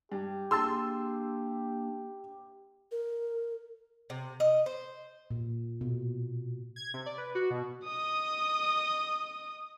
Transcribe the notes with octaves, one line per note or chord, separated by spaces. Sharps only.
G2 G4
A#3 D4 G#4 A5 C6 E6
A#4
C3
D#5
C5
A#2
B2
G#6
C3
D5
B4
F#4
B2
D#5 D#6